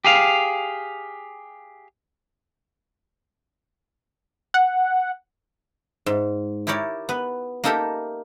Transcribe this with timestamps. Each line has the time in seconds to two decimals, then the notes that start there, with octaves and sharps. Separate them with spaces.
0.05 G4 G#4 F5
4.54 F#5
6.06 G#2
6.67 E4 G4 A#4 C#5 D5
7.09 B3 B4
7.64 A#3 D#4 G4 A4 A#4 E5